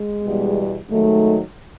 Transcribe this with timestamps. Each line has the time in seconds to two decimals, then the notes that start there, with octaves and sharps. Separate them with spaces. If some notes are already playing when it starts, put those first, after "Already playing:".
Already playing: G#3
0.24 E2 B2 G3
0.89 G#2 D#3 F#3 A3